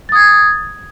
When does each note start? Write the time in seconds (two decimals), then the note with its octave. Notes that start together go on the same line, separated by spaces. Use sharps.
0.09 A6
0.12 D#6
0.15 G#6